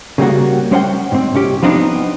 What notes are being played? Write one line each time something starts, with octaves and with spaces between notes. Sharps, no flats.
C#3 G3 A#3 F#4
G3 C#4 C5 C#5 F#5 G5
G#2 C4
C2 C#4 G4
F3 B3 C4 D4 D#4